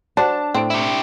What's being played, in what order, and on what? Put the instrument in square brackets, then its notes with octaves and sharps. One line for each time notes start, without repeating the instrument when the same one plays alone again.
[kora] D4 [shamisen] F#4 C5 [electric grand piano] A5
[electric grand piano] A2 D7 [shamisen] C4 A4
[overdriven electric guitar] E4 G4